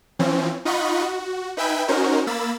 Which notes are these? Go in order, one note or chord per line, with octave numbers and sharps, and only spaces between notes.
E3 F3 C4 C#4
D#4 F4 D#5 F#5 B5 C#6
F#4
D#4 B4 E5 G5 G#5 B5
C#4 D#4 F#4 A#4 C5
A#3 B5 E6 A6